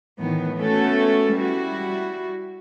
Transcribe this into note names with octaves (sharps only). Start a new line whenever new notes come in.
A2 D#3 E3 B3
A3 B3 C#4 F#4 A4
G3 E4 F#4